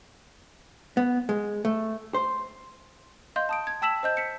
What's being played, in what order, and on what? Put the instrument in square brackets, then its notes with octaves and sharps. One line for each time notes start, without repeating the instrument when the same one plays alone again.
[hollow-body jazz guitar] B3
G#3
A3
C5
[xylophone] D#5 F5 C6 G6
A5 D#6 D7
G#6
G5 A5 E6 B6 E7 F#7
C5 D#5 G6
B6 C#7